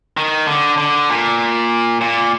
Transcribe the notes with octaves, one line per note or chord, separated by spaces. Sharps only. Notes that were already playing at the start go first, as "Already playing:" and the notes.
D#3
D3
D3
A#2
A#2